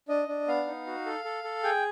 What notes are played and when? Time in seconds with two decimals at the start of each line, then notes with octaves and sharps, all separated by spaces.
0.09 D4 D#5
0.28 D4
0.47 B3 F5
0.67 D#4
0.87 F#4
1.06 A4
1.25 A4
1.44 A4
1.64 G#4 G5